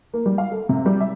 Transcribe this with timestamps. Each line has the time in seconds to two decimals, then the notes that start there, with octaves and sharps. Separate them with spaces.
0.14 A#3
0.26 G3
0.38 F5
0.52 A4
0.69 C3
0.86 G3
1.00 E5